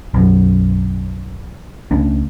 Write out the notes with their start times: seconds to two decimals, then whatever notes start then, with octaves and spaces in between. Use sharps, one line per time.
0.14 B1 F#2
1.91 C#2 A3 C#4 D4